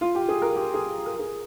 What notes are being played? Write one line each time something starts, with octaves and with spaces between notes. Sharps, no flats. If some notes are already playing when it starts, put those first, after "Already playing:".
F4
G4
G#4
A#4
G4
G#4
A#4
G#4